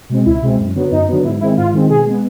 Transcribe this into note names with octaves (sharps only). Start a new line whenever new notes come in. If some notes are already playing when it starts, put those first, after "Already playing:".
B2 G#3 C4
C#2 E4
B2 G#3 C4
F#2
D3 F#3 B3
F#2 D#4
D3 F#3 B3
G#2 E4
D#3 G#3 C4 E4
G#2 F4
D#3 G#3 C4
B2 G#4
G#3 B3